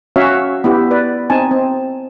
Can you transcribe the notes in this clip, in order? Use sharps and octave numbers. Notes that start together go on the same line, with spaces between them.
C#4 F#4 C#5 E5 F5
B3 E4 G4
B4 D5
C4 D#4 G#5 A5
C4